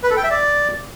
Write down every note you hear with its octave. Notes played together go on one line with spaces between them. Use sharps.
B4
A4
G5
E5
D5